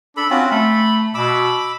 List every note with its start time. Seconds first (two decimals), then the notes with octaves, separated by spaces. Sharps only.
0.17 D4 A4 B5
0.30 C4 C#4 F4 F#4
0.52 A3 B5
1.14 B2 B5 D6 E6